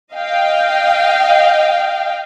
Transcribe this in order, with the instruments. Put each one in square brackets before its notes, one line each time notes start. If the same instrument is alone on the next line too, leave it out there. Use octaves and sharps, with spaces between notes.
[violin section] D#5 F5 G5